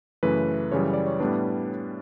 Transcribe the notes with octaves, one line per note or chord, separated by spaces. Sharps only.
F#2 C#3 E3 A3 B4
F#2 C#3 E3 G3 C#5
D5
C#5
A2 G3 B3 D4 B4